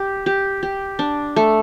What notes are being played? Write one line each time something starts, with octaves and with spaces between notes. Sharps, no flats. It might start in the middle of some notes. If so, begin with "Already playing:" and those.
Already playing: G4
G4
G4
D4
A3